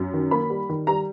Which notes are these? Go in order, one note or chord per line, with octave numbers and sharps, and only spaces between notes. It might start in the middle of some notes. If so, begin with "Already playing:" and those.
Already playing: F#2
D#3
A#3 B5
G3
D#3
G3 A#5